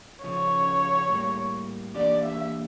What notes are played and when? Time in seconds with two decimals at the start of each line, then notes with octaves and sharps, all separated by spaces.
0.23 C#3 F3 C#4 C#5
1.09 A2 G3 A#3
1.95 E3 A#3 D4 G4 D5
2.24 E5